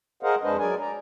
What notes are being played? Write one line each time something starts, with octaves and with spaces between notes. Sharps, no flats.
G#4 A#4 C5 D#5 F5 F#5
F2 G#3 D4 B4 C5 D#5
F#3 G#4 A#4 D5 G#5
D5 A#5